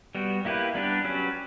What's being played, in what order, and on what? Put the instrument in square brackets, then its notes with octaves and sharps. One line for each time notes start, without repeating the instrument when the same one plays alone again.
[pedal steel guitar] G3 B3 F#4
A#3 E4 G4 B4
G3 B3 D4 G4 B4
F#3 C#4 G4 B4